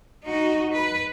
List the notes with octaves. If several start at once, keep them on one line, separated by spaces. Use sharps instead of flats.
D#4 F#4
B4